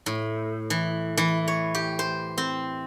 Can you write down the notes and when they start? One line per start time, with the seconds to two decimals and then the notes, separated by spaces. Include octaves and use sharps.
0.06 A2
0.70 E3
1.17 E3
1.48 C#5
1.75 G4
1.99 C5
2.38 C4